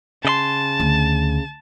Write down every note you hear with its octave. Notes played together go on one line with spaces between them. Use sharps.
C#3 D#5 A5 C6
D2